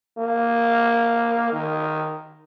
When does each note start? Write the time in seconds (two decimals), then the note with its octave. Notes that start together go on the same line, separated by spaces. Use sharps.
0.18 A#3
1.52 D#3